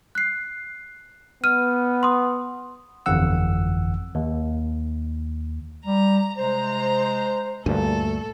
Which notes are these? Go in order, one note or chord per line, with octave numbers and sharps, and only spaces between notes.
F#6 C7
B3 F6 D#7
C6 D#6
G1 F2 E3 F#5 E6
D#2
G3 A#5
C3 G#3 C5 A#5
D2 G2 A#2 A3 A4